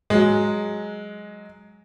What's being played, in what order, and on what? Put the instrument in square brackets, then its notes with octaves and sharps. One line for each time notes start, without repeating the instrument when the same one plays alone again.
[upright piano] F#3 G#3